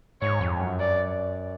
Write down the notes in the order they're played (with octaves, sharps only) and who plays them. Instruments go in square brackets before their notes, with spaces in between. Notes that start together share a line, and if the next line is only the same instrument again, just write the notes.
[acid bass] G#2 [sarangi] C#5
[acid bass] F2
F#2
[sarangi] D5